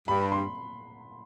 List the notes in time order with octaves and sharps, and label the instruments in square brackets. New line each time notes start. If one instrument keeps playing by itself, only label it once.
[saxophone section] G2 [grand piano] B5
[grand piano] C6